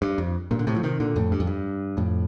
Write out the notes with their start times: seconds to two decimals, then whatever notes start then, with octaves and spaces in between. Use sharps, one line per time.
0.02 G2
0.18 F2
0.51 G2 A#2
0.59 D3
0.67 A2 C3
0.76 F3
0.83 C3 D#3
1.00 A#2 D3
1.16 F2 A2
1.32 G2
1.40 F2
1.47 G2
1.97 F2 A2